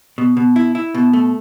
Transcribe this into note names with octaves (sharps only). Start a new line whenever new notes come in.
B2
B2
E4
E4
B2
A3